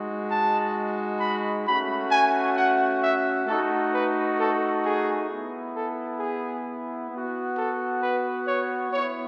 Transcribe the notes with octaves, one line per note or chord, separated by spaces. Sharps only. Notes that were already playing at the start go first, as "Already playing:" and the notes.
Already playing: G#3 D#4 F#4
A5
B5
A3 C#4 F#4 B5
G#5
F#5
E5
A3 D#4 F#4 A4
B4
A4
G#4
B3 E4
A4
G#4
B3 F#4
A4
B4
C#5
B3 E4 C#5